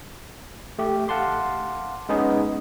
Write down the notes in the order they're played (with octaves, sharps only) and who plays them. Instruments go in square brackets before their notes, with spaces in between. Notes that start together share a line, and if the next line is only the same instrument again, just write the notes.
[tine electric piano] A3 G4
F5 F#5 A5 C6 D6
G#3 B3 C#4 D#4 G#4